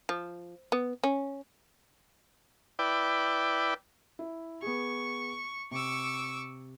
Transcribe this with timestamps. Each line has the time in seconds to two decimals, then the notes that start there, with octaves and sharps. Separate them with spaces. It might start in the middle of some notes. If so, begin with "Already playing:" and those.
0.09 F3
0.72 B3
1.04 C#4
2.79 E4 B4 D5 G5
4.19 E4
4.62 B3 G#4 C#6
5.71 C3 C#6 D6 E6